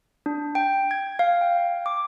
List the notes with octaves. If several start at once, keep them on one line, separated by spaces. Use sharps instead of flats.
D4
G5
G#6
F5
G5
D6